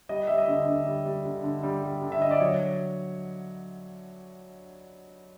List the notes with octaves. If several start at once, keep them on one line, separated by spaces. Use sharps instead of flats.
G3 D#5
G3 E5
D#5
D3
D3
G3
G3
D3
D3
G3
G3
D3
E5
D3 D#5
D5
F#3 C#5